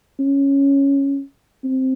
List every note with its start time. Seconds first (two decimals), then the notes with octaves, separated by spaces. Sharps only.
0.19 C#4
1.64 C4